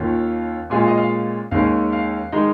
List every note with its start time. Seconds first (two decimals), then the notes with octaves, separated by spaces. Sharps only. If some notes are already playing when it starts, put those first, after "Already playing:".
Already playing: D#2 D#3 C#4 F4
0.70 A#2 G#3 C#4 F4 G#5
0.80 F5
0.88 D#5
0.97 F5
1.51 D#2 D#3 G#3 C#4 F5
1.92 F5
2.32 D#3 G#3 D#4